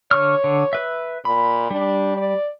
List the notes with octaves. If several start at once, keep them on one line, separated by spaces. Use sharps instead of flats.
D3 C#5 C#6 F6
D3
B4 E5
A#2 B5
G3 D4
D5